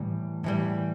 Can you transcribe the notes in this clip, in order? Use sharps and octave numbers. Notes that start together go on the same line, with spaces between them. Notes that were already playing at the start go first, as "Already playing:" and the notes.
Already playing: A2 E3 G3
A2 E3 G3